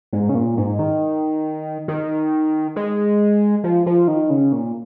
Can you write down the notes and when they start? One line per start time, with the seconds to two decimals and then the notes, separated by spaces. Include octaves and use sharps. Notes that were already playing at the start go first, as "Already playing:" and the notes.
0.13 G#2
0.29 C#3
0.35 A#2
0.57 G#2
0.79 D#3
1.88 D#3
2.76 G#3
3.64 F3
3.86 F3
4.08 D#3
4.30 C#3
4.53 A#2